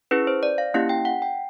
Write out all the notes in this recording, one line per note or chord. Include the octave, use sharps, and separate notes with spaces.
C#4 E4 G#4 B4
C5
D5
F5
A#3 C#4 E4 G4 F5
G5
F#5
G5